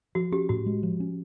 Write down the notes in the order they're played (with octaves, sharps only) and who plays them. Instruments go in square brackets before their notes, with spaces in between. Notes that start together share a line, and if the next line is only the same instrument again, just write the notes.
[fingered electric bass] F3 [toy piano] F#4
[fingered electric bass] C#4 [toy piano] G4
[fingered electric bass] A2 [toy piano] F#4
[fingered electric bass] G#3
F3
C#4